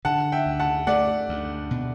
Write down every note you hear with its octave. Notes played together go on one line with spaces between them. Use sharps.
D3 F#5 A5
E5 G5
D2
F#5 A5
A3 D5 F#5
D2
B2